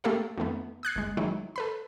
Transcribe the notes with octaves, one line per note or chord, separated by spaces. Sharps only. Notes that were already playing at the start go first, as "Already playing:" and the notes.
A3 A#3 G4 A4 A#4 F5
F2 D#3 A3 B3
D#6 F#6 G#6 C7
G1 G#3
D#3 F#3 G#3 E4
A4 B4 B5